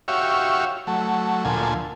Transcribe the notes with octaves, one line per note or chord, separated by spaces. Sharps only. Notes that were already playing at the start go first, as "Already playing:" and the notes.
F#4 G4 C#5 E5 F5
F#3 A3
D2 A#2 F3 A4 G#5